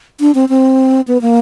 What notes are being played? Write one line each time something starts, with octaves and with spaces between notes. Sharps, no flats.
D4
C4
C4
B3
A#3